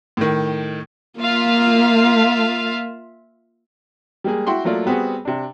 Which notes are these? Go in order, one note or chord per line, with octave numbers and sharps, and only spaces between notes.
A2 D#3
A#3 F4 E5 F5
G3 G#3 A#3 G#4
E4 F#4 G5 C6
F#3 A3 A#3 F4 D5
G3 B3 C4 F#4 G#4
C3 D4